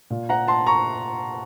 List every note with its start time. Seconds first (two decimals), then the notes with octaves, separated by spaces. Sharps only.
0.10 A#2
0.29 F#5 A#5
0.48 A5 C6
0.67 A#5 C#6